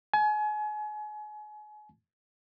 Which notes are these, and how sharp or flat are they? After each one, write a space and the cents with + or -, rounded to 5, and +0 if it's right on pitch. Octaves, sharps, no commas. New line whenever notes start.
G#5 +35